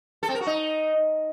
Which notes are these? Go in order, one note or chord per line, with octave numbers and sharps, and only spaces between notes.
A4
C4
A#4
F#4
D#4